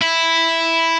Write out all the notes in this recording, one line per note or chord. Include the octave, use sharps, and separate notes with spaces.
E4